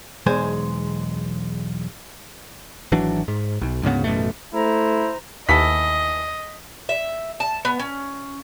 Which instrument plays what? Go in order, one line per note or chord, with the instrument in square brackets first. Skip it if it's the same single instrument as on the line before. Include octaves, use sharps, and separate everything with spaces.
[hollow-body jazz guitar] B1 E2 G#3 C5 G#5
[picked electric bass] G#1 E3 F#3 D4
G#2
B1
D2 G#2 C#3 B3
A1 F#2 B2 A3
[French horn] A3 [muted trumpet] E4 [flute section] C5 A#5
[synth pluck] D#2 [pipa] E3 B3 A4 [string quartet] D#5 [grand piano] B6
[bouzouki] E5
A5
B3
C#4